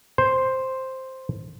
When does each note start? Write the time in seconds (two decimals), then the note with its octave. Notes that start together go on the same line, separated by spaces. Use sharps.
0.18 C5